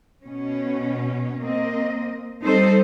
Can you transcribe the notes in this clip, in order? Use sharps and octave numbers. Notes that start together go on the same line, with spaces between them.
B2 C#4
A#3 C4 D#5
G3 C4 D#4 A4 C5